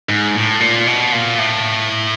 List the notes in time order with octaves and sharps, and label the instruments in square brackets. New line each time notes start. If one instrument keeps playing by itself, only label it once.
[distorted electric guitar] G#2
A2
A#2
B2
A#2
A2